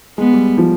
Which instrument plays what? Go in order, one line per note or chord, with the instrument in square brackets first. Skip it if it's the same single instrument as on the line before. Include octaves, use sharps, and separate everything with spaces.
[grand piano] G#3 [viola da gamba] B3
[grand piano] G3
F3